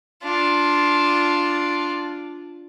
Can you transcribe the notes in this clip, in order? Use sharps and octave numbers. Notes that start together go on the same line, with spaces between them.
D4 F4